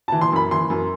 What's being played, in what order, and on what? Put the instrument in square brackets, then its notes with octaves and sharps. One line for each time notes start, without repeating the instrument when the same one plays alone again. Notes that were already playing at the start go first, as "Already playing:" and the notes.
[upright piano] E3 A5
C6
F#2 B5
E3 C6
F#2